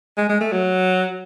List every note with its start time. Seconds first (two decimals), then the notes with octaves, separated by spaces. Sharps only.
0.18 G#3
0.29 G#3
0.41 A3
0.52 F#3